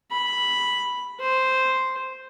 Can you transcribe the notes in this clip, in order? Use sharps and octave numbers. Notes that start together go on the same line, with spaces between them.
B5
C5